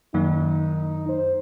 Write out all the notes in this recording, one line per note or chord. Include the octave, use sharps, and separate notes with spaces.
F#2 D#3 A#3 D#4
C5